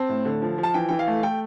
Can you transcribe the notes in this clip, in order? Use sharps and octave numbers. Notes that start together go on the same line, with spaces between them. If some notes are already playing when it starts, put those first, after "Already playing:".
Already playing: C4 A5
A2
D3
F3
F3
A5
E3 G5
E3 G5
F5
A3
A3 G5